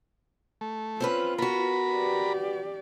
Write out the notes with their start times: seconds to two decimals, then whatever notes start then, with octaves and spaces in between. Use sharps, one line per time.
0.61 A3
1.00 C4 C#4 F4 B4
1.38 B3 F#4 A#4 B4 B5
1.92 G4 D5